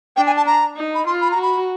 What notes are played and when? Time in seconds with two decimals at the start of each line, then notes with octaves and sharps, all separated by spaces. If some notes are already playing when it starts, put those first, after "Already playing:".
0.17 D4 G5
0.27 G#5
0.37 A5
0.47 A#5
0.77 D#4
0.95 B5
1.06 F4 C6
1.21 B5
1.31 A#5
1.37 F#4
1.42 B5